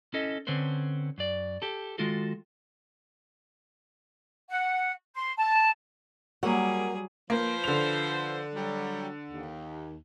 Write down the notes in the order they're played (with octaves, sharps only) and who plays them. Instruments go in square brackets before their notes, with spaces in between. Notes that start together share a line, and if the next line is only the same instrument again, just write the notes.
[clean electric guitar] C#4 E4 A4 D#5
D3 C4 C#4 B4 C5
F#2 D5
G4 A4
D#3 G#3 F4 F#4 A4
[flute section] F#5
C6
A5
[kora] F#3 [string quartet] G3 G#4 [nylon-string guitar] A#3 A#4 F#5
[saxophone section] F3 B4 C5 [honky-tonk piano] A#3
[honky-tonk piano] D3 F7
[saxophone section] F#3 G3
D#2